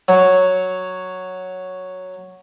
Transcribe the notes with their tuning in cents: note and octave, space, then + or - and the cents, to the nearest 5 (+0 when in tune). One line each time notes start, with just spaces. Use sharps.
F#3 +0 C#5 +0